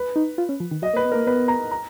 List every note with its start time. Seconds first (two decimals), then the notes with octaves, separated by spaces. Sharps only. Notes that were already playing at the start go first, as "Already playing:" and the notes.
Already playing: B4
0.16 D#4
0.38 F4
0.49 C#4
0.60 F3
0.71 D#3
0.82 F#3 D#5
0.93 A#3
0.96 B4
1.05 B3
1.12 A#3 A#4
1.27 B3 B4
1.48 A#5
1.71 A#5